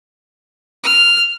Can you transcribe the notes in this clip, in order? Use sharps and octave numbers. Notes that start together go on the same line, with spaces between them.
F6